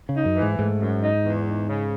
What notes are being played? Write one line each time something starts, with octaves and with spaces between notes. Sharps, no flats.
C#3
D#4
F#2
E3
G#2
G#2 A3
F#2
D#4
E2
D#4
C#3